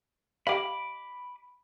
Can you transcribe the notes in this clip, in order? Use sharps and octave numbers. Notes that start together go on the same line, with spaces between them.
G4 D#5 F5 B5 D6